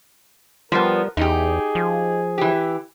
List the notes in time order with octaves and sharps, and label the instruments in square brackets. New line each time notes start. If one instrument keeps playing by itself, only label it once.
[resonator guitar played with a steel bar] F3 B3 [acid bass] G3 [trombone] A#4
[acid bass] E2 [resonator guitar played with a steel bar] D#4 G4 [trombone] G#4
[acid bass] F3
[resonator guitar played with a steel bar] E3 G4